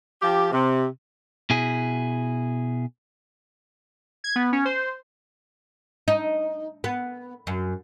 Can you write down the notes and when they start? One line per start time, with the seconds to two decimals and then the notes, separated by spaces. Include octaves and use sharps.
0.21 F3 G4
0.51 C3
1.50 B2 E4 G#4
4.24 G#6
4.36 B3
4.52 C#4
4.65 C5
6.08 D#4
6.84 B3
7.47 F#2